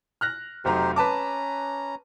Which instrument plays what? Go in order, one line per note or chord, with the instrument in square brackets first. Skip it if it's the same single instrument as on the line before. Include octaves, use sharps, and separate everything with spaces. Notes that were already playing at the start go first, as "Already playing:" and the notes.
[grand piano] F6 F#6 A#6
[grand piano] F1 F#3 A#5 [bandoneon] D#4 G4 C5
[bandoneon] C#4 A#5 [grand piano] B4 A5 D6